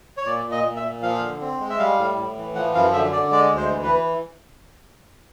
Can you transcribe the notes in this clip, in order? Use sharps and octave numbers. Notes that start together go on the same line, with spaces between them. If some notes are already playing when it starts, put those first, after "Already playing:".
C#5
A#2 D5
A#2
D#5
A#2
E5
A#2
F3 F5
D3
C4
G#3
E5
G3 F5
A2
A2
E3
F3 F#5
F#2 F5
D3 E5
D3 D5
G#3 D5
D2
C5
E3
B4